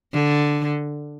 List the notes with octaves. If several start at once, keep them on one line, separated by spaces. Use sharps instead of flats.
D3